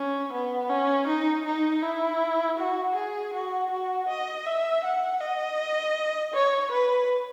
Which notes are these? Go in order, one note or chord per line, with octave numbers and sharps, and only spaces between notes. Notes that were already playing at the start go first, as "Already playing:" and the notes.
Already playing: C#4
B3
C#4
D#4
D#4
E4
F#4
G#4
F#4
F#4
D#5
E5
F#5
D#5
C#5
B4